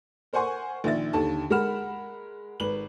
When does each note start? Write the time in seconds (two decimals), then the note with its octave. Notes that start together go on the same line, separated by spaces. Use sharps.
0.33 A#4 C5 F#5 G#5 C6 C#6
0.84 A#1 D#3 E5 A6
1.13 D#2 D3 A4 A5
1.50 G#3 A#4 F#5 B5 F6 E7
2.60 G#1 B4 F#7